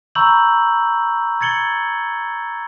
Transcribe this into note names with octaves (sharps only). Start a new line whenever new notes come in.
A#5 B5 C#6 E6 G6 F#7
G#6 A6 C#7 F#7 G7